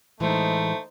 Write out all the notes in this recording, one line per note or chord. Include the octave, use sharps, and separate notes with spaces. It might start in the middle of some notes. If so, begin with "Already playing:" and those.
A2 E3 G#3 A3 D#4 C5